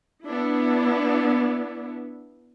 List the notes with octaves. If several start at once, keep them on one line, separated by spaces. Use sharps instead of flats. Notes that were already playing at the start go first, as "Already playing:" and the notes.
B3 D4 E4